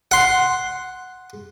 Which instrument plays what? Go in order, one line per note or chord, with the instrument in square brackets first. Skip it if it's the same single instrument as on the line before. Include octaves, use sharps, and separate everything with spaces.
[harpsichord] F#5 C6